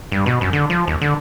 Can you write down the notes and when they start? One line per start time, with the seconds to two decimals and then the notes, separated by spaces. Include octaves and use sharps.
0.12 G2
0.26 B2
0.41 F#2
0.53 D3
0.70 F3
0.88 D#2
1.01 D3